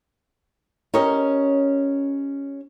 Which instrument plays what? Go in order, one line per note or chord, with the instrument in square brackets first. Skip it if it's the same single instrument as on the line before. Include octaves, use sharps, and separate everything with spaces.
[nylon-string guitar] C#4 G4 A#4 C#5 D#5